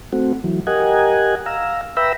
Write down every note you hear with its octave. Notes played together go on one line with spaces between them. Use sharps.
A3 C4 F#4
E3 F#3
G4 A#4 D#5 F#5 G#5
F5 A#5 E6
B4 E5 G5 A#5 B5 E6